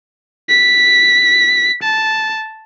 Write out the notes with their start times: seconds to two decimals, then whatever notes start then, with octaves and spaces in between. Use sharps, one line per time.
0.49 B6
1.83 A5